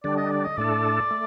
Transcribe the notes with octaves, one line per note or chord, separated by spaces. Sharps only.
D3 G3 D4 D5
D#5
D5
D#5
A2 A3 D4 A4 D5
A3